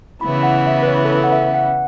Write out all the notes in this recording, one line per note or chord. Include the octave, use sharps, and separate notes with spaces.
C#3 E3 B3 E4 B5
F#5
E5
B4
C#5
A4
B4
F#5
E5
F#5